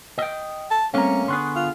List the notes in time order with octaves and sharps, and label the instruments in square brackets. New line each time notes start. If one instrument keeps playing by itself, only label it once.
[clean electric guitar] D#5 G5
[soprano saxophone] A5
[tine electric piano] G3 C4 A#5 [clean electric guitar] A3 A#3 [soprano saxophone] C#4
[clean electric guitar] D3 B3 G#4 [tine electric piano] C6 C#6 F#6
[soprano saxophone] F4